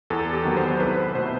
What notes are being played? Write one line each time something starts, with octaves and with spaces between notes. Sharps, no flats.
E2 A4
G4
D#3 F#3 B3
C5
C2 B4
C5
B2 A3 C5